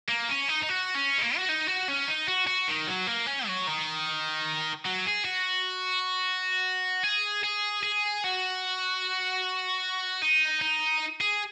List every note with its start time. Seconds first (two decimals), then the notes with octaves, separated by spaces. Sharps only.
0.09 A#3
0.28 C#4
0.48 D#4
0.62 D#4
0.69 F#4
0.95 C#4
1.18 G#3
1.22 A#3
1.36 F#4
1.49 D#4
1.68 F#4
1.88 C#4
2.08 D#4
2.28 F#4
2.47 F#4
2.68 D#3
2.87 F#3
3.07 A#3
3.26 C#4
3.47 F#3
3.67 D#3
4.86 F#3
5.06 G#4
5.25 F#4
7.04 G#4
7.44 G#4
7.83 G#4
8.24 F#4
10.22 D#4
10.62 D#4
11.21 G#4